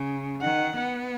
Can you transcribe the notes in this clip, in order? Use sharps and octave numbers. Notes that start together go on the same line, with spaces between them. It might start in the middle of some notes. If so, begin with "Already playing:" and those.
Already playing: C#3
D#3 F#5
B3